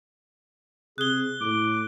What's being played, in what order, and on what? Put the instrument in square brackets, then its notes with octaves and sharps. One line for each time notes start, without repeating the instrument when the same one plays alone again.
[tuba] C3 [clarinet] G#4 [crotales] F#6 G7
[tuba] A2 [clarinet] D6